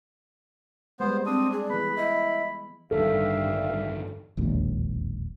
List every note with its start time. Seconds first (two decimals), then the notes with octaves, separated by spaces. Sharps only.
1.00 G3 G#3 B3 C5
1.26 C4 D4 D#6
1.52 G#4 D5
1.70 E3 B3 B4 B5
1.96 E4 D#5
2.91 A1 G2 D3 D#3 A4 E5 F5
4.37 E1 A#1 D#2